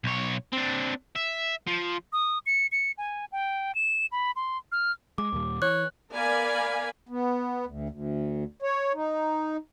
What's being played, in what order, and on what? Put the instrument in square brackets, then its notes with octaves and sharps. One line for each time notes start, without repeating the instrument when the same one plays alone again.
[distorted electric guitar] B1 C#5
C4 D4
E5
F3
[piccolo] D#6
C#7
C#7
G#5
G5
E7
B5
C6
F6
[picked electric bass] G#3 [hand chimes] D6
[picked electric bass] D#2 A#2 G3
[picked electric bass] E3 [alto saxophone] C#5 [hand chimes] F#6
[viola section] B3 A#4 D5 F5 G#5 B5
[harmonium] B3
D2
D2
C#5
D#4